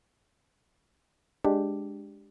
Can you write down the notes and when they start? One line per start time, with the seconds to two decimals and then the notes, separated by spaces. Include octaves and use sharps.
1.44 G#3 D4 G4